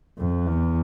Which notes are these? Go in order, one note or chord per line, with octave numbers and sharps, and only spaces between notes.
F2
E2